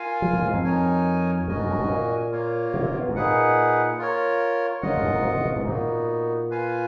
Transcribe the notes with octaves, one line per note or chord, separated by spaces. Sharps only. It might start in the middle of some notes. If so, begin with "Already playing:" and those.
Already playing: F4 A#4 F5 G#5
F3
A#2
G#2
F2
D#4 A#4 C#5 G#5
F2 F#4 A#4 D#5 G#5
F#2
F2
F#2
A#2
A#3 F4 A#4 C#5
B2
A#2
B2
G#2
A#2 D#4 G#4 B4 F#5
F4 A#4 C#5
C#3 F4 A#4 D#5 F#5
F2
F#2
G#2
A#2
B2
B2
G#2
A#2 B3 D#4 F#4
F4 B4 F5 G#5